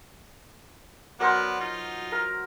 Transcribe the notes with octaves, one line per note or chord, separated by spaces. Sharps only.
F#3 B3 A#4 C5 D5 F#5
D#4 F4
A#4